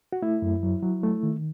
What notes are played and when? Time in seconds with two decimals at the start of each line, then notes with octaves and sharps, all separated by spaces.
0.13 F#4
0.22 A3 E4
0.42 F#2
0.63 F#3
0.82 F#3
1.03 A3
1.23 D#3